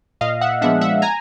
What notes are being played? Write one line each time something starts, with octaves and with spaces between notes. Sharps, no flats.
A#2 D#5 F5
E5 F#5
F3 G#3 B3 D4 E5 F#5
E5 F#5
G#5 A#5